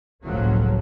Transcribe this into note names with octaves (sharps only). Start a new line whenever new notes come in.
F#1 C#2 A2 F3 F#3 C#4